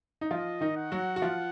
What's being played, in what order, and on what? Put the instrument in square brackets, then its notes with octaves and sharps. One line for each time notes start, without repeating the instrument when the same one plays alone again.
[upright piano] D#4
[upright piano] F3 F4 [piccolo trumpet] D#5
[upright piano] D#3 D#4
[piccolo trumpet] F#5
[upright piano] F#3 F#4
F#4
F3 F4